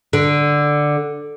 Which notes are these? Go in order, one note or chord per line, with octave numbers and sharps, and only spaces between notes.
D3